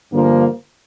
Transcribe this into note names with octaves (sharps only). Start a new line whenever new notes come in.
G2 D3 F3 A#3